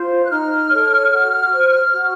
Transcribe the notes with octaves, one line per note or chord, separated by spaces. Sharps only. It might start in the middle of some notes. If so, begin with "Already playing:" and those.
Already playing: F4 C5
F#6
D#4 F6
A4 C#5
F#4
C5
F#4